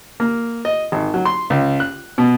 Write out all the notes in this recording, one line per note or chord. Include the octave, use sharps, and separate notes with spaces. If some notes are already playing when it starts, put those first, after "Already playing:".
A#3
D#5
G#1
F#3
C6
C#2
F#6
B2